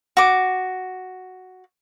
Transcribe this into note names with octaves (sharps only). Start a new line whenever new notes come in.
F#4 D6